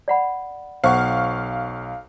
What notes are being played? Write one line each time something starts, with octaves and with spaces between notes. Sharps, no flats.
D5 F#5 B5
B1 C5 F5 F#5 C#6